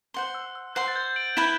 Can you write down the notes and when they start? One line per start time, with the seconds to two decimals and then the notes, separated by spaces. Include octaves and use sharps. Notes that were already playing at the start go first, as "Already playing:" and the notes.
0.14 C5 F#5 C6
0.35 E6
0.55 E6
0.75 C5 F#5 C6 F#6
0.88 A6
0.96 G6
1.16 D7 F#7
1.37 E4 B4 E5 B5 E7 G7